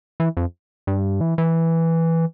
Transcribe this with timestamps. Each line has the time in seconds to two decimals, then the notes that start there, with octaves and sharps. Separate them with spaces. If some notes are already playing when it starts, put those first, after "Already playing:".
0.20 E3
0.37 F2
0.87 G2
1.21 E3
1.38 E3